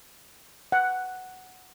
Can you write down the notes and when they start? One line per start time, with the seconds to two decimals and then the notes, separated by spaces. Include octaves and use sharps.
0.72 F#5